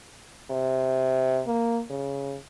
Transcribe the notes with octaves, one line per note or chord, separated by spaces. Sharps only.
C3
A#3
C#3